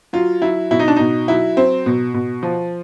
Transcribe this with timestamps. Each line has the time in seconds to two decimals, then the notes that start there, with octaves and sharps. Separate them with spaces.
0.13 F#3 F4
0.42 F#3 E4
0.71 B2 E4
0.79 D#4
0.88 D4
0.96 B2 D#4
1.28 F#3 E4
1.57 F#3 C4
1.86 B2
2.14 B2
2.43 F3